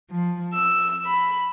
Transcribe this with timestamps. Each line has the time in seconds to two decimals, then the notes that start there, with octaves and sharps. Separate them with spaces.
0.10 F3
0.55 E6
1.06 B5